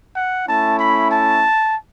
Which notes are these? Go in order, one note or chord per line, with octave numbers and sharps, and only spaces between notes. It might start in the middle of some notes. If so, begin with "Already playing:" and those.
F#5
A3 C#4 E4 A5
B5
A5